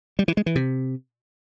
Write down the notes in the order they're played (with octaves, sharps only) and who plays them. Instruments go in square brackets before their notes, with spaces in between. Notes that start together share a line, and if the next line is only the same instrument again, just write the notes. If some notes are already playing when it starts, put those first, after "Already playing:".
[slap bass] G3
E3
G#3
E3
C3